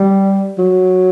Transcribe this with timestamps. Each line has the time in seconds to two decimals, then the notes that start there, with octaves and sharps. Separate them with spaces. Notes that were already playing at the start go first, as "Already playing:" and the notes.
Already playing: G3
0.58 F#3